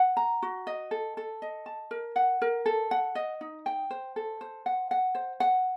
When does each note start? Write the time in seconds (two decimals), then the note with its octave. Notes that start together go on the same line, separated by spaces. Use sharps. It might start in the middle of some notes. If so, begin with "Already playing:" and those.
Already playing: F#5
0.17 A#5
0.42 F#4
0.67 D#5
0.91 A4
1.17 A4
1.42 D#5
1.66 A5
1.91 A#4
2.16 F#5
2.42 A#4
2.66 A4
2.91 F#5
3.15 D#5
3.41 D#4
3.66 G5
3.90 C5
4.16 A4
4.41 C5
4.66 F#5
4.91 F#5
5.15 C5
5.40 F#5